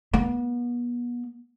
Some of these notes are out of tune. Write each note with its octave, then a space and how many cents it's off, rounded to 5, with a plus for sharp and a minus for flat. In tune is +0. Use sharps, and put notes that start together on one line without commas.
B3 -35